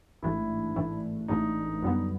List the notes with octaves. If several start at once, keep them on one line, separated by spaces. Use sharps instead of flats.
A1 G#2 E3 A3 D4 E4
A1 G#2 E3 A3 D4
A1 G#2 E3 A3 D4 D#4
F#2 D3 G3 B3